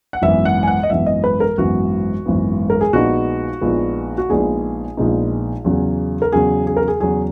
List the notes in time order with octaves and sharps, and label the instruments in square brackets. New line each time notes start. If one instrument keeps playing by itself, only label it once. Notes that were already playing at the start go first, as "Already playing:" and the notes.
[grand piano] F#5
G#1 F#2 E3 B3 E5
F#5
G#5
F#5
D#5
G#1 F#2 E3 B3 E5
D#5
B4
A#4
G#1 F#2 E3 B3 F#4
G#1 F#2 E3 B3
A#4
G#4
A#1 A#2 G#3 B3 D#4 F#4
A#1 A#2 G#3 B3 D#4
F#4
A#1 A#2 G#3 B3 D#4 G#4
A#1 A#2 G#3 B3 D#4
E2 C#3 F#3
A#4
E2 C#3 F#3 G#4
G#4
A#4
G#4
E2 C#3 F#3 G#4